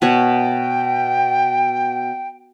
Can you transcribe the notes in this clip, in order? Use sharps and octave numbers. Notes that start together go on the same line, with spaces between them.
B2 C#5 F#5 G5